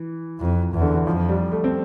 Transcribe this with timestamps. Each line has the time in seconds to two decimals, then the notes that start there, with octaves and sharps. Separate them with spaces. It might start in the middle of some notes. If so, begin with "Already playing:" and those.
Already playing: E3
0.39 F2
0.73 E2
0.81 D3
0.95 E3
1.07 F2 F3
1.29 G3
1.52 A3
1.64 C4